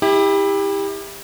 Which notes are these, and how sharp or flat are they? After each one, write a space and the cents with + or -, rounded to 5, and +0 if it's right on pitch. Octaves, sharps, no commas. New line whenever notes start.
E4 -20 G4 +25